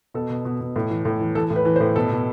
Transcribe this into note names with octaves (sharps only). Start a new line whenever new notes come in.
B2 A4
B2
B2
B2
A2
E3
A2
E3
E3 A4
A2
B4
E3
C5
A2
B2 A4
B2